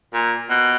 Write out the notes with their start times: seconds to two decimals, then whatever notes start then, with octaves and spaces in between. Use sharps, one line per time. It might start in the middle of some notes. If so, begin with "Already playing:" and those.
0.14 A#2
0.50 B2